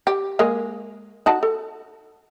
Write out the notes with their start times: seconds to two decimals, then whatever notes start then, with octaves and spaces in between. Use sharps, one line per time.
0.07 G4
0.39 G#3 A#3 G#4
1.26 D#4 F#4 A5
1.43 A4